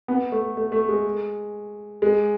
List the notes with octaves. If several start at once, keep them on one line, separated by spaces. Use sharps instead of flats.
B3
A3
A3
A3
G#3
G#3